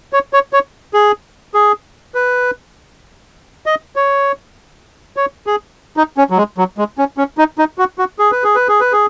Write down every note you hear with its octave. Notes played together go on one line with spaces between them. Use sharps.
C#5
C#5
C#5
G#4
G#4
B4
D#5
C#5
C#5
G#4
D#4
C#4
F#3
G#3
F#3
G#3
C#4
C#4
D#4
D#4
F#4
F#4
G#4
B4
G#4
B4
G#4
B4
G#4